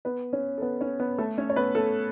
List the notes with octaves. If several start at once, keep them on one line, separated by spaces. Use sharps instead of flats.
B3 B4
C#4 C#5
A4
B3 B4
C#4 C#5
B3 B4
A3 A4
C#4 C#5
C#5
B3 B4
A3 A4